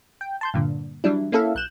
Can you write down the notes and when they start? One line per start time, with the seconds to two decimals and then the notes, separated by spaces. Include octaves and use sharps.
0.21 G5
0.41 A5 C6 G6
0.54 G2 A#2 D3
1.04 E3 F#3 G3 D4 E4
1.32 A#3 C#4 E4 A4 E5 F5
1.55 B1 F#6 G6 E7